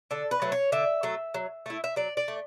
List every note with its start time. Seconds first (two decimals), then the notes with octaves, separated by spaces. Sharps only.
0.11 D3 A4
0.31 B4
0.42 F#3 A3
0.52 C#5
0.72 D3 E5
1.03 F#3 A3
1.34 F#3
1.66 A3 E4
1.84 E5
1.96 F#3 D5
2.17 D5
2.28 A3